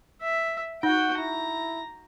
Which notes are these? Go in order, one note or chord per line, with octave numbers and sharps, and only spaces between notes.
E5
D#4 F#4 F#5 G5
E4 A#5